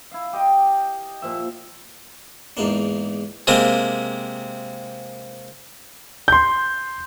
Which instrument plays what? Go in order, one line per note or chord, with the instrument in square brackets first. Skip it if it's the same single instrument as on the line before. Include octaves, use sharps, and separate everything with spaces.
[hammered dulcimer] E4 F5
G4 D#5 G5
A#2 F3 E5
[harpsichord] E2 G#2 A#3 D4
C3 G#3 A#3 C4
[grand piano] C6 G6